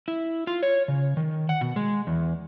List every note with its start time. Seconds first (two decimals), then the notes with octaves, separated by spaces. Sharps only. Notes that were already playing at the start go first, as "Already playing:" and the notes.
0.08 E4
0.47 F4
0.63 C#5
0.88 C#3
1.17 D#3
1.49 F#5
1.61 B2
1.76 G#3
2.07 E2